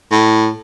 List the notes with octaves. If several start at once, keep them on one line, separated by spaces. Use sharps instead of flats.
A2